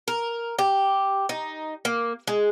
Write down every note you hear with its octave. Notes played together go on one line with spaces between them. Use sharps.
A#4
G4
D#4
A#3
G#3